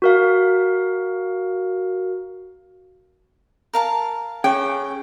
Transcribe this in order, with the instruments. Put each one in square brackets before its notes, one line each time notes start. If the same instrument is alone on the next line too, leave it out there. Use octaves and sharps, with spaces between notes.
[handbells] F#4 A#4 F5
[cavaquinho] A#4 F5 A5
[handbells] C#4 [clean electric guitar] G#4 C#5 [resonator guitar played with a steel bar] G5